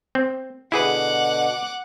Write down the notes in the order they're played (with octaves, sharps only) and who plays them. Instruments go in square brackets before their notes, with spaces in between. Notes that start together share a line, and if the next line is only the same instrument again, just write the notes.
[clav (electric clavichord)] C4
[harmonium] B2 D3 [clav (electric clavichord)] E4 G#4 B4 [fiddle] F#5 D6